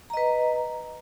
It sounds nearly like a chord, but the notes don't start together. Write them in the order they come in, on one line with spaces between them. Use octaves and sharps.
A#5 D#5 B4